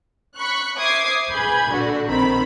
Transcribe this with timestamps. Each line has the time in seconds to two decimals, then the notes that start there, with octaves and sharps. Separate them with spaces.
0.36 B5 C#6 F#6
0.78 C5 E5 D6 D#6 G#6 C7
1.29 G#4 B4 B5 G6 G#6
1.71 A#2 D3 D4 F#4
2.07 A#1 D#3 C4 B5